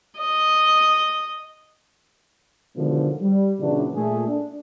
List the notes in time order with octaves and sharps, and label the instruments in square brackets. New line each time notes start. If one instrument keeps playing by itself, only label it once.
[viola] D#5
[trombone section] B2 D3 D#3 F3 F#3 G#3
G3
A#2 C#3 E3 F#3 D4
A#2 A3 G#4
D4